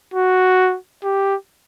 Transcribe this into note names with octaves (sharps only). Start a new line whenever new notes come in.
F#4
G4